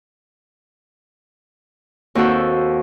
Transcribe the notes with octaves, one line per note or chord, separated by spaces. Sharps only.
D#2 C4 F#4 A4